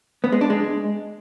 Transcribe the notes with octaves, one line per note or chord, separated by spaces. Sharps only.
B3
G#3
D4
G#3